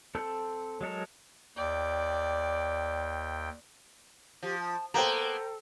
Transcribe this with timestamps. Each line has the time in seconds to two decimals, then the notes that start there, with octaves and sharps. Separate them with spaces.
0.15 C4 A4 A5 E6 G6
0.81 F#3 G#3 A4 A#4
1.57 D#2 D5 G5
4.43 F3 G4
4.60 A5
4.94 A#3 B3 A4 C5 G5 A#5